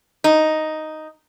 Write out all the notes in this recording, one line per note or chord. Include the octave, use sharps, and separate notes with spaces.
D#4